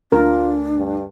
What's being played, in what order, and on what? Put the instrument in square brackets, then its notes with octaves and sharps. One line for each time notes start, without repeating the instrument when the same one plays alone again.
[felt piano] D2 [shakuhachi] D4 [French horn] F4 [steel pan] A#4
[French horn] G2